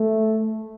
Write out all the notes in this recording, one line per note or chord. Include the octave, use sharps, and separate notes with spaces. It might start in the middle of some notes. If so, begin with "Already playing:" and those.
Already playing: A3